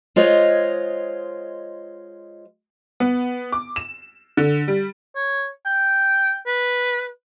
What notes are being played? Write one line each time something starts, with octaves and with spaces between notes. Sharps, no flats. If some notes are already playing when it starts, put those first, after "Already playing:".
G#3 F4 C5 C#5 D#5
B3
D6
E7
D3
G3
C#5
G5
B4